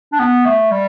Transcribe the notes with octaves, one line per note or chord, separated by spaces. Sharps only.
D4
B3
A3
G3